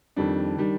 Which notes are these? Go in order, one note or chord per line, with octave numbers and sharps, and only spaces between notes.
F2 D#3 G3 D4
D#3 G3 D4